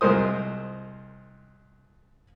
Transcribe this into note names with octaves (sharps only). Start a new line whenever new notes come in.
C2 G#3 A#4 C5 D#6